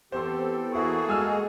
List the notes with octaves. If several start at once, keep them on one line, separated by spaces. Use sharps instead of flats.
E3 B3 C4 G4 A4 C5 C6
A#3 E4 F#4 G#4 A4 C#6
G#3 G#5 E6 F6